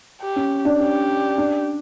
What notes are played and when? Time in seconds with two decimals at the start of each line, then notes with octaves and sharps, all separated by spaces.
0.22 G4
0.36 C#4
0.65 D4
0.79 C#4 G4
1.38 D4